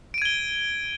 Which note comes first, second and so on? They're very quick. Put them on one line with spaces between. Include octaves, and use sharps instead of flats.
D7 D#7 G#6 G7